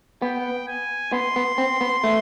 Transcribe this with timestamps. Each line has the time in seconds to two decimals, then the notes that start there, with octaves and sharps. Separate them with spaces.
0.22 B3 G5
0.67 G#5
1.12 B3 C6
1.36 B3
1.58 C4
1.81 B3
2.04 A3